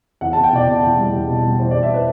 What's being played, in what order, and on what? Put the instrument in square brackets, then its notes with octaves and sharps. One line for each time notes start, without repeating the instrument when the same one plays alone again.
[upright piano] E2 F#5
A5
E2
G5
B2 D5
B2
E2
G3
E2
B2
G3
E2 C5
D5
E2
E5
B4